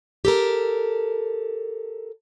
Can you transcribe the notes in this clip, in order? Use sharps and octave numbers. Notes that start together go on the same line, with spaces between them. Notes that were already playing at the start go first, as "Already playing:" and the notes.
G4 A4 A#4